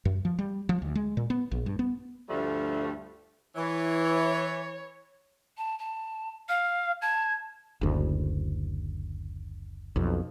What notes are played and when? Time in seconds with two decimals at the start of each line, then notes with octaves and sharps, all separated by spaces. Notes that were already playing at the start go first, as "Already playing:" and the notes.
0.05 F#2
0.25 F3
0.39 G3
0.69 F3
0.82 D2
0.95 G#3
1.17 A#2
1.30 B3
1.51 A#1
1.66 G2
1.79 B3
2.30 D2 G2 F3 G3 A3
3.56 E3 C#5
5.58 A5
5.79 A5
6.49 F5 F6
7.02 A5 G#6
7.81 F#1 D2
9.96 B1 F2